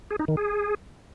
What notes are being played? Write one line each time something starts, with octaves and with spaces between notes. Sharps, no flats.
G#4
D#4
D#3
G#4